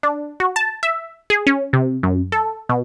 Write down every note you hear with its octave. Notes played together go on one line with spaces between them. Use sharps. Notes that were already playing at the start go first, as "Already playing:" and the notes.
D4
F#4
A5
E5
G#4
C#4
C3
F#2
A4
B2